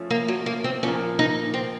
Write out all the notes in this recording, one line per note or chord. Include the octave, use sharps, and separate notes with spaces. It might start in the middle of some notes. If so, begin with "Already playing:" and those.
Already playing: F3 A3 C#4
A#3
F#3
A#3
C4
A#2 F3 A#3 C#4
D#4
C4